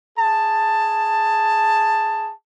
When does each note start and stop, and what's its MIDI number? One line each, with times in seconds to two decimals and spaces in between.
0.19 2.32 68
0.19 2.32 81